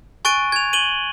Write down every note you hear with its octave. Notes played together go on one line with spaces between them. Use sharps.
G#5 C#6 F#6 A6 D7 D#7
G#6 F7
D#7 F#7 G7